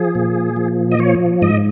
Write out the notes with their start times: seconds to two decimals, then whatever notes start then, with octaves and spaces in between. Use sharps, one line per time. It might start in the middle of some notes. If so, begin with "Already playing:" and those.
Already playing: F3 G#4
0.15 A#2
0.56 F3
0.92 D#5
0.99 F3 C#5
1.42 G#2 D#5